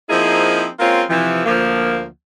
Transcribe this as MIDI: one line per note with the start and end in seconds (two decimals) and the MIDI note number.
0.10 0.68 53
0.10 0.68 58
0.10 0.68 60
0.10 0.68 63
0.10 0.68 64
0.10 0.68 68
0.79 1.03 56
0.79 1.03 58
0.79 1.03 60
0.79 1.03 61
0.79 1.03 65
1.09 1.42 48
1.09 1.42 52
1.09 1.42 53
1.46 2.05 38
1.46 2.05 53
1.46 2.05 58